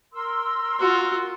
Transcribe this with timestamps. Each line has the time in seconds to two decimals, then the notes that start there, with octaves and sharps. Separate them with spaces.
0.13 A#4 C6 E6
0.80 F4 F#4